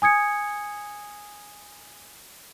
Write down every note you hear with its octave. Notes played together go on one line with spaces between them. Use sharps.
G#5 D#6 G#6 C#7